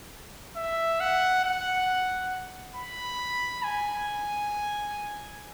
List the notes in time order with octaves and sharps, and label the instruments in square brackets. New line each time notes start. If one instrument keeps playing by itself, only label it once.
[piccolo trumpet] E5
F#5
F#5
B5
G#5